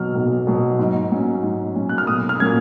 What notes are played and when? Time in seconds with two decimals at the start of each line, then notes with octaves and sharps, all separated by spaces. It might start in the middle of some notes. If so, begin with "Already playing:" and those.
Already playing: B1 B2 F#3 F6
0.15 B1
0.47 B2 F#3
0.79 G#2
1.12 F#3 C#4
1.43 G#2
1.75 F#3 C#4
1.89 F#6
1.98 F6
2.07 B1 D#6
2.29 F6
2.40 A#2 F#3 A#3 C#4 G#6